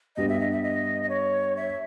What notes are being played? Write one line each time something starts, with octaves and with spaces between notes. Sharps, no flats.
G2 G3 B3 D#5
E5
D#5
E5
D#5
D#5
C#5
E5